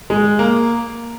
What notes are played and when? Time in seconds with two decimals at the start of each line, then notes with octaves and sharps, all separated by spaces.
0.10 G#3
0.39 A#3